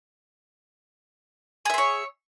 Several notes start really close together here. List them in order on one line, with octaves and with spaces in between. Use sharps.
G#4 E5 C5 C#5